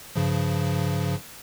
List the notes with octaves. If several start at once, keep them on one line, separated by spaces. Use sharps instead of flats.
G2 C#3 F3